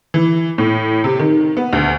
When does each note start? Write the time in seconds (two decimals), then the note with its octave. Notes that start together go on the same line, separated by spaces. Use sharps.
0.14 E3
0.58 A2
1.04 C3
1.19 D#3
1.57 B3
1.73 D2